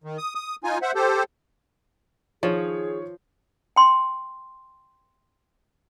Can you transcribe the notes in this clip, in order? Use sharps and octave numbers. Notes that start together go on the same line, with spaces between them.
D#3
D#6
D#6
D#4 F4 G#5
C5 E5 F#5
G4 A4 C5
D#3 F3 G#4 C#5
G5 C6